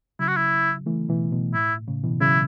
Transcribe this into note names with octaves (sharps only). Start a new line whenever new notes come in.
C#3 F#3 E4
F#4
E4
E3 A3
B2 E3
B2
A2 E4
A2 C#3
B2 E3
C#3 F#3 E4